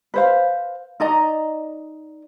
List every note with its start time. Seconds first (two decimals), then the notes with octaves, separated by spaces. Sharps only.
0.14 B4 C5 F5
1.00 D#4 D5 D#5 A#5